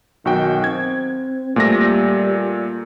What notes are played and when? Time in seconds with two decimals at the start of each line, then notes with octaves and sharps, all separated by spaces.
0.25 B1 D#3 F#4 G5
0.64 C4 G#6
1.56 A#2 G3 A3 A#6